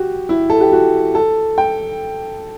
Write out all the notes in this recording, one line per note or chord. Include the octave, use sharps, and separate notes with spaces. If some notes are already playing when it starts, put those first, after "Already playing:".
Already playing: F#4 G4
E4
A4
G4
F#4
A4
G5